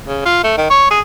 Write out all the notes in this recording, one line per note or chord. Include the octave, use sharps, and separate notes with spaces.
C#3
F4
A3
D#3
C#5
G#4